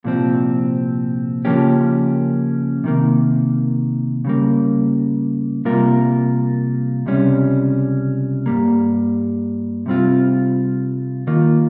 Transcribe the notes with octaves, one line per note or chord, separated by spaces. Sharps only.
C2 A#2 F3 C4
C#3 F3 A#3 C#4 G4
C3 D#3 A#3
C#3 G3 A#3
C3 G3 A#3 F4 A#4
C#2 C3 G3 C#4
G2 G3 A#3
C3 G3 C4 F4
D#2 D#3 A#3 F4